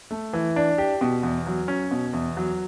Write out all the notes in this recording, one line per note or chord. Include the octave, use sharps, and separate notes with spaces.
A3
E3
D4
G4
B2
E2
F#3
C#4
B2
E2
F#3